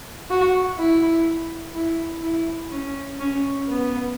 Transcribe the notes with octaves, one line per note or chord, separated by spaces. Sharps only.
F#4
E4
E4
E4
C#4
C#4
B3